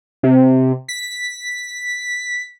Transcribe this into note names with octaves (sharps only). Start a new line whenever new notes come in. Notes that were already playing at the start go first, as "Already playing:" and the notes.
C3
B6